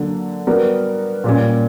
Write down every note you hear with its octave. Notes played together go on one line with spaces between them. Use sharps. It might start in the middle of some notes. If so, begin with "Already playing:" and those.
Already playing: D3 F#3 A#3
G3 B3 F#4 A#4
A#2 G3 C#4